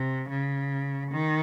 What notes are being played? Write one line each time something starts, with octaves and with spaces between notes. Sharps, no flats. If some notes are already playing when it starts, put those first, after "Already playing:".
Already playing: C3
C#3
D#3